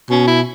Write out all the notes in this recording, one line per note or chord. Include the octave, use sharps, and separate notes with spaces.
B2 C#4
E4